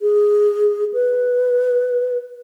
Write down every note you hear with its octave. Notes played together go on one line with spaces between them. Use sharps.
G#4
B4